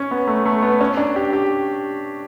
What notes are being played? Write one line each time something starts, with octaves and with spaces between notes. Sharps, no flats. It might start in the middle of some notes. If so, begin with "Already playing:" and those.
Already playing: C#4
B3
A3
A3
B3
C#4
D4
G4
G4